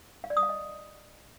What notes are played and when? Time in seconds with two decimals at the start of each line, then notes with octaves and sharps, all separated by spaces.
0.24 F5
0.30 D5
0.37 D#6
0.43 F5
0.49 D#5